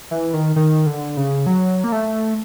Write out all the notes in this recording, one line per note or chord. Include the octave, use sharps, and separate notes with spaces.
E3
D#3
D#3
D3
C#3
F#3
A#3
A3